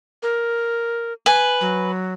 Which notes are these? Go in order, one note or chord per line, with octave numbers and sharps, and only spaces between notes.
A#4
B4 G#5
F#3